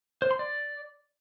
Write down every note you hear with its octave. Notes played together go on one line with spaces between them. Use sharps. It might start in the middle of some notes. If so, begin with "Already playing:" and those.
C5
C6
D5